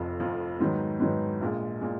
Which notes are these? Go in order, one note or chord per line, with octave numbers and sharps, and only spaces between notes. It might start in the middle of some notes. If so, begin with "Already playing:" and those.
Already playing: F1 F2 F3
F1 F2 F3
G#2 D#3 F#3 B3
G#2 D#3 F#3 B3
A#1 A#2 G#3
A#2 G#3